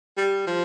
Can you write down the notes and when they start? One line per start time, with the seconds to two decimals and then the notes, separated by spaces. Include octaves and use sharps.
0.17 G3
0.47 F3